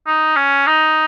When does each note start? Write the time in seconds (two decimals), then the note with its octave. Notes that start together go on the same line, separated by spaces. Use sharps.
0.07 D#4
0.36 C#4
0.67 D#4